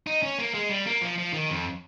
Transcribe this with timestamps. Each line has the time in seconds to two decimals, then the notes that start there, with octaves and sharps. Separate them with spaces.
0.07 D#4
0.23 C#4
0.39 A#3
0.54 G#3
0.70 G3
0.87 A#3
1.01 F3
1.18 F3
1.33 D#3
1.49 F2